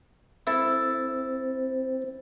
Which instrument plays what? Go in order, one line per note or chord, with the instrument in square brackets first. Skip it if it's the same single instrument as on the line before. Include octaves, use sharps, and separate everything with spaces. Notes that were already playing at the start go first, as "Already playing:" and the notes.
[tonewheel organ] C4 [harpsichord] E4 A4